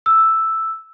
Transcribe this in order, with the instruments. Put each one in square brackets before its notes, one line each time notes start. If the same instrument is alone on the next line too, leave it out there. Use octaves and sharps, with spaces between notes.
[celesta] E6